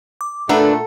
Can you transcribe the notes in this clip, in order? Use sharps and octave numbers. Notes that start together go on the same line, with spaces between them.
D6
A#2 A3 D4 A4 B4 F#5 A#5